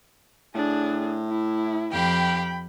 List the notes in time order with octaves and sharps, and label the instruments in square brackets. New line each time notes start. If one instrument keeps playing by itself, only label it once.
[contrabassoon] A2 [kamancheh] D4 G#4
[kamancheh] E4
[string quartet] F2 G4 F5 [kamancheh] G5 B5